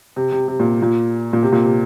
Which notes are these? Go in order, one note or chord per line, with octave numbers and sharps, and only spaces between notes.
C3
C3
C3
A#2
A#2
A#2
C3
A#2
C3